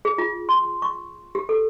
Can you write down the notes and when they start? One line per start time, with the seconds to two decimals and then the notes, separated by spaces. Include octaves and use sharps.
0.05 G#4
0.18 F4
0.49 C6
0.82 C#6
1.35 G4
1.49 A4